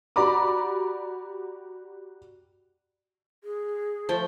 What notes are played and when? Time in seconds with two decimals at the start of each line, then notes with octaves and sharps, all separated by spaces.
0.16 F#4 G4 D5 A#5 B5 D6
3.44 G#4
4.09 F3 A3 G5